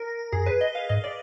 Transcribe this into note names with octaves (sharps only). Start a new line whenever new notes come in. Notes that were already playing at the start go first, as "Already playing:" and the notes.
Already playing: A#4
F#2 G#4
B4
D#5
F5
G#2 D#5
D5